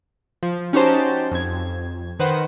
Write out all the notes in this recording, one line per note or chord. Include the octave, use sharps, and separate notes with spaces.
F3
C#4 D#4 F#4 G4 C5 A5
F2 G#6
D#3 B4 C5 F#5